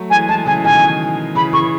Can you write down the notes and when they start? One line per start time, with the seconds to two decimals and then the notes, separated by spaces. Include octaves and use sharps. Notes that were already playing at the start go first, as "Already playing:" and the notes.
Already playing: F#3 A3
0.10 E3 G#3 G#5
0.28 E3 G#3 A5
0.46 C#3 E3 G#5
0.64 B2 D#3 G#5
1.35 C#3 E3 B5
1.53 C#3 E3 C#6